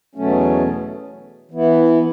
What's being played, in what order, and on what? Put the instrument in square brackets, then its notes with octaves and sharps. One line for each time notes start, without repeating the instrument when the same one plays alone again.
[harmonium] E2 B2 F#3 A3 C#4
E3 B3 E4